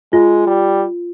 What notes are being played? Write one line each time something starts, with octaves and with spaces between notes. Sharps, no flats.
G#3 F4
G3